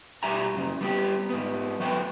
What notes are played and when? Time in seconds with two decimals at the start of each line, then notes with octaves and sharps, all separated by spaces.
0.23 B2 G3 G4 E5 G#5 A#5
0.55 F#2 C#3
0.81 G3 B3 G4
1.30 G#2 B3
1.80 F#3 A3 B4 C5 G5